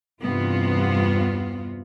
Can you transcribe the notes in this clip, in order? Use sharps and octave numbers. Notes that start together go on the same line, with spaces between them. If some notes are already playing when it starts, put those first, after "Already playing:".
E2 G2 C3 B3 C4 F4